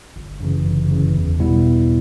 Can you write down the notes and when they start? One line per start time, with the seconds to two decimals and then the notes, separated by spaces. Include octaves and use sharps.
0.16 G1
0.41 F#2 C#3 E3
0.66 G1
0.90 F#2 C#3 E3
1.15 E2
1.40 B2 G3 B3 E4